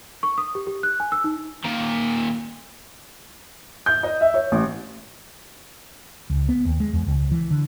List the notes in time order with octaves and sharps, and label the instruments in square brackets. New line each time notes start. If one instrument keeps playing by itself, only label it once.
[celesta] C#6
D#6
G4
G4
F#6
G#5
E6
D#4
[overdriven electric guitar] A#2 D#3
[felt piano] G6
D#5
E5
C#5
A1
[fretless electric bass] C#2
B3
D#2
G#3
E2
C#2
E3
D3